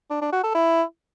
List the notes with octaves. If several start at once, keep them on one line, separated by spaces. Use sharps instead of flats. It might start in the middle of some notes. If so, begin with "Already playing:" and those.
D4
D4
F#4
A4
E4